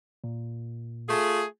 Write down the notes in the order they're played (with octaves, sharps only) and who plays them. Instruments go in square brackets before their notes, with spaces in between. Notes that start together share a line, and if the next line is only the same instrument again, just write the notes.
[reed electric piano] A#2
[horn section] A3 F4 G#4